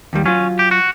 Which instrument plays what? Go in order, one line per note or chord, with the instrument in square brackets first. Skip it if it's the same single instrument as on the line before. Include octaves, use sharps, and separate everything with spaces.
[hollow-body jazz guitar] D#2 D#3 G3
[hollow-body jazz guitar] F#3 F4 [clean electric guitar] C#4
[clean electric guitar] G4
F#4